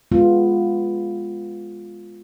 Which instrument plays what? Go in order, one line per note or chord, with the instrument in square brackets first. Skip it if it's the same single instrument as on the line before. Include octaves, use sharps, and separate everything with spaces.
[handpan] G#3 B3 F4